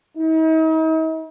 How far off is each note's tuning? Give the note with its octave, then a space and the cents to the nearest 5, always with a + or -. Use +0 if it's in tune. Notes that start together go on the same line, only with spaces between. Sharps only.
D#4 +45